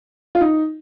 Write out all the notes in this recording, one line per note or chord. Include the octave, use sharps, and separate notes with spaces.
F4
D#4